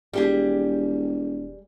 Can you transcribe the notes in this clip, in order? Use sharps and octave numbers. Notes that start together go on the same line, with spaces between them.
E1 G3 G4 G#4